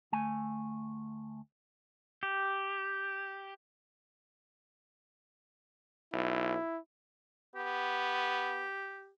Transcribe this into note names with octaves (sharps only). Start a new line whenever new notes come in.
D2 A3 G#5
G4
B1 E4
B3 G4